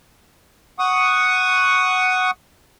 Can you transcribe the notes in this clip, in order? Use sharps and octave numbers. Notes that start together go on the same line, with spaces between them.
F#5 C#6 D#6